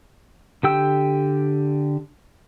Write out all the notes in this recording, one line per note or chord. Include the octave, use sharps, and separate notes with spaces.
D3 G4 G5 E6